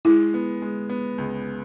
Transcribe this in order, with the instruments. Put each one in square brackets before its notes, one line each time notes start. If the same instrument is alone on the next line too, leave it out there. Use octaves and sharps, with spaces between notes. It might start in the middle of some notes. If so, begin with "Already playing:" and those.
[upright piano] G#3 [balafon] E4
[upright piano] B3
G#3
B3
C#2